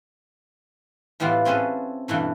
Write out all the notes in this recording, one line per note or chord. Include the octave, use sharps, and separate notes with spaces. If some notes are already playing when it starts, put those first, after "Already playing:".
A2 E3 G3 B3 F4
C4 C#4 G#4 A4 B4
G2 B2 E3 A3